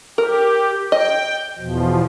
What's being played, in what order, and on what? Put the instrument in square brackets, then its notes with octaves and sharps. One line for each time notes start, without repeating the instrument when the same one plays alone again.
[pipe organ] G4 [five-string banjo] A#4
[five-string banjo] D#5 [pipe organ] G5
[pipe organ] E2 B2 F3